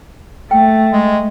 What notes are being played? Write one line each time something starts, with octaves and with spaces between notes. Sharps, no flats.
A3 G5
G#3